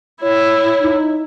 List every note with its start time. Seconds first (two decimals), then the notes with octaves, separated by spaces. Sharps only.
0.22 E4 C#5
0.81 D#4